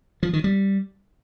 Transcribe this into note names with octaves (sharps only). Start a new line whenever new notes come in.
F3
D#3
G3